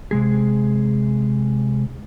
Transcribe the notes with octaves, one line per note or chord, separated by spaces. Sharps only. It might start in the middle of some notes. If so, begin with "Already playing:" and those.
C3 G#3 G#4